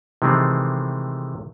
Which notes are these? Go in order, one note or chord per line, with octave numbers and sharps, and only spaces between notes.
C3 D#3 E3 G#3 A3 C4